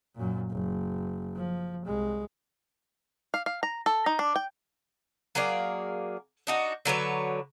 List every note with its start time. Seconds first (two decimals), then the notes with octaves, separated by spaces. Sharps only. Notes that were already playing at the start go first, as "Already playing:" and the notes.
0.15 F#2 A#2
0.51 F#1
1.36 F3
1.86 C2 G#3
3.34 F5
3.46 F5
3.63 A#5
3.86 A4
4.06 D#4
4.19 D4
4.36 G5
5.35 F#3 A#3 G#4 D5
6.47 D4 D#4 F#4
6.85 D3 F#3 B4 C#5